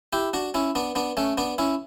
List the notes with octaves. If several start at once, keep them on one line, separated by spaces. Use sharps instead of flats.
E4 G4
D4 F#4
C#4 E4
B3 D4
B3 D4
A3 C#4
B3 D4
C#4 E4